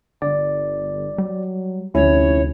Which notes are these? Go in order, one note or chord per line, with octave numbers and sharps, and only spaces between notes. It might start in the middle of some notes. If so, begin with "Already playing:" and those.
G1 D3 D5
F#3 G3
F1 D2 C#4 E4 C#5